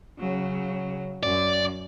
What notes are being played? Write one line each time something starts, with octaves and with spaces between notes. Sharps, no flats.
C#3 F#3
F#2 D5